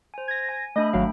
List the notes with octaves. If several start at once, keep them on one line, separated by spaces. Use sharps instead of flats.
C5 G#5
G#6 A#6
G#5
A3 D4 D#5 B5
G#1 F#3 F5 G5